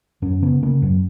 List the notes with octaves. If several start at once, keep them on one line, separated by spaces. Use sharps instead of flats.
F#2 C#4
C#3 B3
C#3 A#3
F#2 F#3